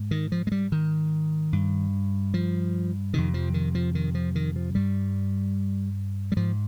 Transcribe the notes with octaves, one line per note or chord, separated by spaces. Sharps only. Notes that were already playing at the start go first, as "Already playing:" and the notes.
Already playing: G#2
D#3
F3
G#3
G3
D#3
G2
F3
F2 C3 D#3
F3
D#3
F3
D#3
F3
D#3
F3
G2 G3
G3
G#2 F3